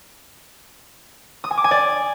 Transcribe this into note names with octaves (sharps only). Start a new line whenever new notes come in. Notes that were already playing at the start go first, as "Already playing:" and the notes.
D#6
G#5
D6
G#5
D5